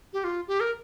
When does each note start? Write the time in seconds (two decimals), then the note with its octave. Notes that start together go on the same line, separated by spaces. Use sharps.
0.13 G4
0.24 F4
0.48 G4
0.60 A#4